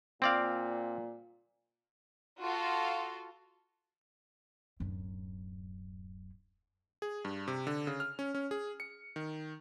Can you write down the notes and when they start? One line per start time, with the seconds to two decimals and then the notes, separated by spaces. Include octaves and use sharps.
0.22 A#2 C4 D5 F5
2.41 F4 F#4 A4 F5
4.80 D1 F#2
7.02 G#4
7.25 G2
7.48 C3
7.67 D3
7.87 C#3
8.00 F6
8.19 C#4
8.35 C#4
8.51 G#4
8.80 C#7
9.16 D#3